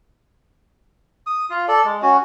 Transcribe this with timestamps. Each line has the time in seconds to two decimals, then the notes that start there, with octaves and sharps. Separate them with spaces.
1.27 D#6
1.50 F4
1.68 A4 D5
1.85 G#3
2.02 C#4 F#4